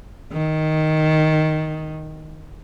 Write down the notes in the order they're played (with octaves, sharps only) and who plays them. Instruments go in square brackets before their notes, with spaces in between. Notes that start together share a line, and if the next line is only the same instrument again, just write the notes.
[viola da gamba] D#3